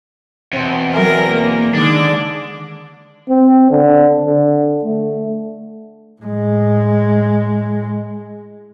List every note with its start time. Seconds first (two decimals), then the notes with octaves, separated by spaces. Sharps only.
0.53 E2 B2 C4
0.94 F#3 A#4 E5 G#5 A#6
1.31 A#3
1.74 D3 D#3 G#3 D4 D6
3.29 C4
3.70 D3
4.27 D3
4.83 A3
6.22 A2 G#3